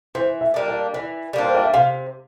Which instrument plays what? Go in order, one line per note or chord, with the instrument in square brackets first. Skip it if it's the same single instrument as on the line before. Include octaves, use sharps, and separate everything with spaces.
[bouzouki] E3 [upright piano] C5
[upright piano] E5
[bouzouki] G3 A#3 D4
[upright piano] D5
[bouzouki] E3 [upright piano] D5
[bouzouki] G3 A#3 D4
[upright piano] C5
D5
E5
[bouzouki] C3 [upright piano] F5